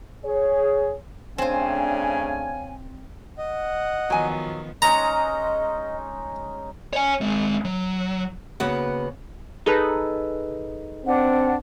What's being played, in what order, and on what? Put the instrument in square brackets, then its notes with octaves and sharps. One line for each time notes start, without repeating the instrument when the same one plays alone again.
[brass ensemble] G#4 C#5
[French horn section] C#3 A3 D4 [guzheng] C4 C5 [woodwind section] C#5 F5 G#5
[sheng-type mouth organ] D#5 [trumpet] F#5
[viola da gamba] D#3 F3 B3 [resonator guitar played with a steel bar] F#3 G#5
[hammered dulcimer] G#3 C#4 D#4 [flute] D#5 [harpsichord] A#5
[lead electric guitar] C#5 G#5
G#3 C4
F#3
[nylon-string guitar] C#3 A#3 B3 F#4 B4 F#5
[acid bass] D#4 [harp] G#4 A4 B4
[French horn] C4 [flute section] D4 F#5